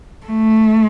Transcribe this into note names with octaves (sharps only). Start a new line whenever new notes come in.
A3